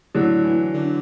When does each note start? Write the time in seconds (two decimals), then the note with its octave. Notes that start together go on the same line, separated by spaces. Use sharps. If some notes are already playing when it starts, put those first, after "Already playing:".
0.15 A2 D3 F#3
0.44 E3
0.74 D3